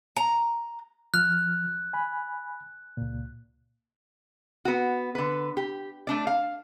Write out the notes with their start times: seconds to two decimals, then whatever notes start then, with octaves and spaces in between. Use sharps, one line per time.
0.16 A#5
1.14 F3 F6 F#6
1.93 G#5 B5
2.97 C#2 A#2
4.65 B3 F#4
5.15 D3 B4
5.57 G4
6.07 A3 D4 D5
6.27 F5